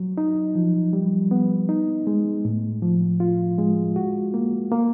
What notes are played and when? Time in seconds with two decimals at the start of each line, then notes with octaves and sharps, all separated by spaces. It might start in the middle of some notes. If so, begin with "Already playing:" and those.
Already playing: F#3
0.18 D#4
0.55 F3
0.93 G3
1.31 B3
1.69 D#4
2.07 G#3
2.45 A2
2.82 F3
3.20 F4
3.58 G#3
3.96 F#4
4.34 A#3
4.72 A#3